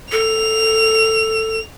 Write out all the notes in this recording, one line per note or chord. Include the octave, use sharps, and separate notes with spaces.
A4 F7